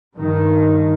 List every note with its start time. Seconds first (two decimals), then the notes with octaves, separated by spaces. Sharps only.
0.16 G2 D#3